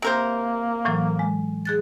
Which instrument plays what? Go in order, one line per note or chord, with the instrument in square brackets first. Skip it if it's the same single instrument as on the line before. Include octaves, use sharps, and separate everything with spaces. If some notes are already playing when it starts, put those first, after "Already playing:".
[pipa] C3 A#4 C5 [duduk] A#3
[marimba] A2 E3 F#3
G#3
G#4 F#6 A6